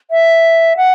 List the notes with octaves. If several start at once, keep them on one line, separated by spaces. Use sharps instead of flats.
E5
F#5